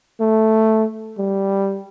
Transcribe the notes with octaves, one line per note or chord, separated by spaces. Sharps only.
A3
G3